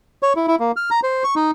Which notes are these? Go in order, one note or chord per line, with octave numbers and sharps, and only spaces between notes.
C#5
E4
E4
A#3
F6
A#5
C5
C#6
D#4